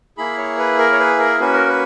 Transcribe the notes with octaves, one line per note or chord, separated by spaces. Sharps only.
A#3 E4 G#4 B5
C#5
B4
A#4
C#5
B4
A#4
A#3 C#4 F#4 B4
A#4
B4